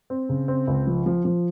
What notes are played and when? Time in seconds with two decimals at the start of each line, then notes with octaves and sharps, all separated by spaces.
0.10 C4
0.29 C#3
0.48 C4
0.67 C#2
0.87 F3
1.06 F3
1.25 F3